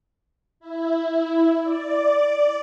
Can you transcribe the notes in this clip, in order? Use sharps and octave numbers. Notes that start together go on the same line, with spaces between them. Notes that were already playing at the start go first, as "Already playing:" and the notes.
E4
D5